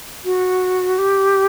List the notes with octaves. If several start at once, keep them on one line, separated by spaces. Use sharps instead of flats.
F#4
G4